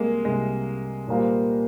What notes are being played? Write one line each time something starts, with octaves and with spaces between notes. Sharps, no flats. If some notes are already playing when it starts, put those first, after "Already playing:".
Already playing: C2 C3 G3 G#3 A#3
C2 C3 G3 G#3
A#2 G3 A#3 F4 C5